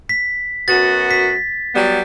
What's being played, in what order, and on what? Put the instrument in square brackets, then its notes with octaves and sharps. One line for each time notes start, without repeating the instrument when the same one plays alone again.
[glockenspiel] B6
[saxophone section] F#2 B3 F#4 [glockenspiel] A6
[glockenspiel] B6
[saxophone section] F#3 G3 B3